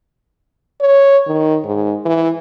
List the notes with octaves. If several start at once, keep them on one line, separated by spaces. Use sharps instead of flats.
C#5
D#3
G#2
E3